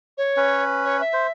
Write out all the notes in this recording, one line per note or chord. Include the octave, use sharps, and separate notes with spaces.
C#5
C#4 B4
C#5
E5
C5